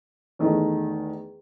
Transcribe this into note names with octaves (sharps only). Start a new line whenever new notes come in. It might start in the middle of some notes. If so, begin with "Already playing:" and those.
E2 D#3 A3